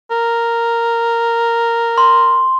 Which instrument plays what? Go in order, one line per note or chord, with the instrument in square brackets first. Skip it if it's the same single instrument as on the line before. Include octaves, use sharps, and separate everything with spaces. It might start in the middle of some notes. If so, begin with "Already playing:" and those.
[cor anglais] A#4
[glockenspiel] C6